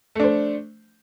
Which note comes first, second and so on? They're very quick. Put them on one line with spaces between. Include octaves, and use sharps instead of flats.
A3 D4 C5